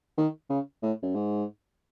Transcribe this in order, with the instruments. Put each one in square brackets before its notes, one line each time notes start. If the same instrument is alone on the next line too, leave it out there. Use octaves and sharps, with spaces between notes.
[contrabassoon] D#3
C#3
A2
F#2
G#2